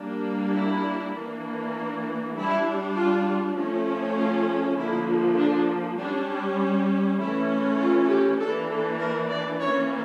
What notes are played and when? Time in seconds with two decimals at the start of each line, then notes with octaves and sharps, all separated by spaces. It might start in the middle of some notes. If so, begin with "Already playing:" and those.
Already playing: G3 A#3 D4
0.54 E4
1.13 E3 A#3 D4
2.35 G3 D4 E4
2.95 F4
3.55 F3 A3 C#4
4.16 F4
4.76 D3 F3 A#3 E4
5.37 D4
5.98 G3 C#4 D4
7.18 E3 A3 C#4 E4
7.79 F4
8.09 G4
8.38 E3 A#3 D4 A4
8.69 A4
8.99 A#4
9.30 D5
9.59 E3 A#3 C#4 C#5